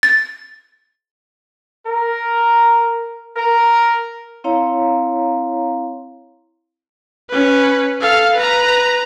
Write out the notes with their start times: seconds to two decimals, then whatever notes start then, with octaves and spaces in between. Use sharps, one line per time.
0.03 A6
1.86 A#4
3.36 A#4
4.44 C4 E4 C#5 F5 A#5
7.30 C#4 B4
8.01 A4 F5
8.36 B4 A#5